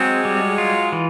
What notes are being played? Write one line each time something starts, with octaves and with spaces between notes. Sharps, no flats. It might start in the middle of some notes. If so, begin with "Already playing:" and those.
Already playing: F#3 G#3 C4
G3
F4
E3